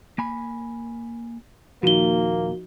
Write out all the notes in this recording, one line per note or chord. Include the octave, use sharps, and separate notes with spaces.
A#3 G#5 B5
D#2 A#2 F3 A#3 D#4 F#4 G7